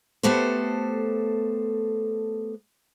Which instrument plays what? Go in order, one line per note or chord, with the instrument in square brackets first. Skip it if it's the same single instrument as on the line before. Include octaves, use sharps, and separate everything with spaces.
[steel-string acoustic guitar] A3 B3 G4 A4 C5